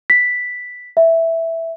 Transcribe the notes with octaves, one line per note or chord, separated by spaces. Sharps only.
B6
E5